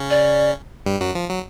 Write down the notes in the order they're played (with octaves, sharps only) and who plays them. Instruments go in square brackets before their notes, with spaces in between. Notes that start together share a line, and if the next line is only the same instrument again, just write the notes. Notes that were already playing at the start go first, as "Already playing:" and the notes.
Already playing: [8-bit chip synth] C#3 C#4
[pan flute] D5
[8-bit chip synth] G2 G3
F#2 F#3
F3
F#3